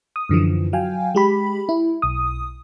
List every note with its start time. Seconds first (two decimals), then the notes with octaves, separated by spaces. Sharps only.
0.16 D#6
0.29 F#2 D3 E3 F3
0.73 F#3 F5 G5 G#5
1.15 G#3 G4 B5
1.69 E4
2.02 B1 D#6